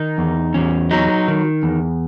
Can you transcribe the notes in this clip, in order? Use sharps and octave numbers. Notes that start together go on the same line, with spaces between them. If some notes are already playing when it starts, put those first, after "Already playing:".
Already playing: D#3 D#4
E2
E2 C#4
F#3 D#4
D#3
E2